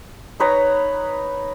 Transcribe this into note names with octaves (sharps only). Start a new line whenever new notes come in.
D#4 B4 C#5 A#5